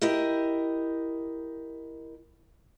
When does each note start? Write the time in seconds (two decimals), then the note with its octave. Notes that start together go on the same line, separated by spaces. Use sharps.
0.02 E4 G4 A#4 D#5